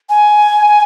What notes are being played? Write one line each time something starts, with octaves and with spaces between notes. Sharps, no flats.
G#5